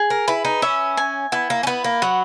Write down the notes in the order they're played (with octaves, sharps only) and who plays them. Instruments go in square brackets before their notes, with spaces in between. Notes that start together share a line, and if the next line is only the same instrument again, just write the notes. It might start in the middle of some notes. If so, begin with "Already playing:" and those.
Already playing: [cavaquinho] G#4
[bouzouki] A#4
[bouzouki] E4 [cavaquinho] B4
[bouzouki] D#4
[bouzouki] C#4 [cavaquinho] E5
[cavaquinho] G#5
[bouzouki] B3 [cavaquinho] E4
[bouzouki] A#3
C#4
[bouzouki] B3 [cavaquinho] B4
[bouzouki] A#3
[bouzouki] F#3 [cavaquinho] F#5